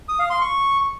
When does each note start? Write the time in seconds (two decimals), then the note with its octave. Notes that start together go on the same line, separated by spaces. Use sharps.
0.09 D#6
0.19 F5
0.30 C6
0.41 C#6